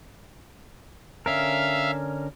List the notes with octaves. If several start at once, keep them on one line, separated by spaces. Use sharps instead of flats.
D3 C#4 A#4 E5 F5